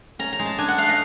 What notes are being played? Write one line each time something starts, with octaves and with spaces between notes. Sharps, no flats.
C#4 A#5
A#5
G#3
A5
D4 G#5
F#5
A3 F5
D#5